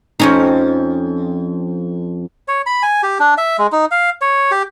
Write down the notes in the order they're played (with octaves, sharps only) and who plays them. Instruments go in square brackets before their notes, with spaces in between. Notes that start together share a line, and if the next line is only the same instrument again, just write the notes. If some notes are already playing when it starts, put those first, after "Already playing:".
[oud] F2 C#4 D#4
[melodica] C#5
B5
G#5
G4
D4
E5
G#3
D#4
F5
C#5
G4